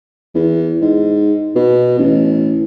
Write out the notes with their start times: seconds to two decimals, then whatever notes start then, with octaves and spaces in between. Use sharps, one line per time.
0.35 E2
0.82 G#2
1.56 B2
1.98 A1